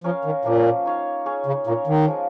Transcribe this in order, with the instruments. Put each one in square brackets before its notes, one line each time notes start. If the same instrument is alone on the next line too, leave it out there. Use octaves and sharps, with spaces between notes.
[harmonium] F3 [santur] C#4 A#4 C#5 F5
[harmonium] D#3
[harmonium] A#2 [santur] F3 A#3 C#4
[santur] D#4 C#5 F5
C#4 G#4 C#5
[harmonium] C#3
[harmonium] A#2 [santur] A#3 C#4 A#4 C#5
[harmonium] D#3
[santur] F3 G#3 F4 A#4